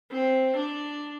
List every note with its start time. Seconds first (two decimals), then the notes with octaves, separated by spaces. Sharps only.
0.12 C4
0.57 D4